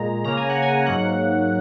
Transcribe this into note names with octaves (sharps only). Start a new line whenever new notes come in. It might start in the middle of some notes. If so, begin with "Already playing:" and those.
Already playing: A#2 G#3 A#5
C#3 A#3 A#5
G#5
F#5
G#5
G#2 F#3 A#3 F#5